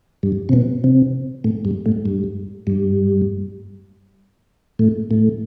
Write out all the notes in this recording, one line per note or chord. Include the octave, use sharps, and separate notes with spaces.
G2
C3
B2
C3
A2
G2
A2
G2
G2
A2
A2